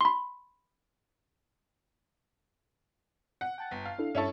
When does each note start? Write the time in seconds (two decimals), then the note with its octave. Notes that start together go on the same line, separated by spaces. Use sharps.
0.01 B5 C6
3.41 F#5
3.58 G5 A5 A6
3.71 G1
3.85 F5
3.98 D4 E4 A4
4.15 G2 C#4 E4 A4 C#6